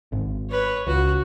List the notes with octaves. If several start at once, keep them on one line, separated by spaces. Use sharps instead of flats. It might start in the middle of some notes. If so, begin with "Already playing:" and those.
G#1
B4 C#5
C#2 F#4